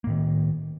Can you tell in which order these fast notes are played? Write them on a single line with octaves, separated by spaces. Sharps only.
A#3 A2 D#3